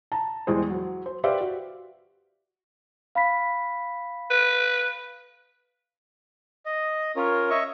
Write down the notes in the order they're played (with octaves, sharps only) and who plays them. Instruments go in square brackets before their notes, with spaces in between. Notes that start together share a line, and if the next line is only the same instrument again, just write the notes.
[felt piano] A5 A#5
E2 G3 G#3 G#4 C5
F#3
C5
G4 B4 C5 D5 E5 F5
F#4
[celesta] F5 B5 B6
[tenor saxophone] B4
[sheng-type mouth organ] D#5
C#4 F4 A#4 C#5
C#5 D#5 E5 C#6